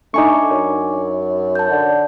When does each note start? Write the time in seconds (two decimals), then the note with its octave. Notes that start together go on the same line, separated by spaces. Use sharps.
0.14 A3 D4 D#4 G#5 C#6 D6
0.50 F#2
1.55 A5 G6
1.71 D3